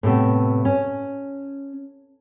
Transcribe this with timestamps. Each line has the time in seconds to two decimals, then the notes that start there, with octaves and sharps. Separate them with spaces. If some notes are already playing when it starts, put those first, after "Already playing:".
0.03 A2 C3 A3 B3
0.65 C#4